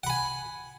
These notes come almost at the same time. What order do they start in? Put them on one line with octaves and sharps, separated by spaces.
F#5 B5 G#5